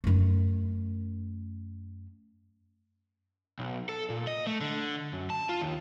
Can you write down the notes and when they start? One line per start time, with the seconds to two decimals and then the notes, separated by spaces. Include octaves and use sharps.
0.04 F#2 A3
3.59 B1
3.89 A4
4.10 A#2
4.27 D#5
4.47 A3
4.61 D3
5.13 F#2
5.30 A5
5.49 F4
5.61 D#2